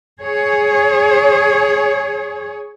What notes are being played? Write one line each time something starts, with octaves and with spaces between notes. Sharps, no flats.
G#4 C#5